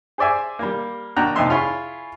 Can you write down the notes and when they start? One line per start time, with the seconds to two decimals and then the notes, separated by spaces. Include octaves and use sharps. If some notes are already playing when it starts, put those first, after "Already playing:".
0.18 G#4 C5 D5 E5 G#5
0.59 G3 A#3
1.16 D#2 D4 F#4 G5 A#5 F#6
1.36 C2 F2 F3 D#4 E5 C6
1.50 E4 F4 G#4 C#5 B5